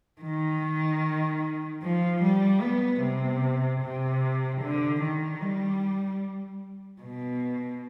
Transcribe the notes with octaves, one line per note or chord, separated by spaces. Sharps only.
D#3
F3
G3
B3
C3
C3
D3
D#3
G3
B2